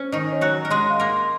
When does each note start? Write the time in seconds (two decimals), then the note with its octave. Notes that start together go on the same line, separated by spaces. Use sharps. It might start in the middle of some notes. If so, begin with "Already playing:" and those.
Already playing: C#4 C5
0.12 D#3 D#4 C#6
0.32 C#5
0.41 F#3 F#4
0.51 A#5
0.65 A#4
0.70 G#3 G#4 C6
0.90 F5
1.00 A#3 A#4
1.10 C6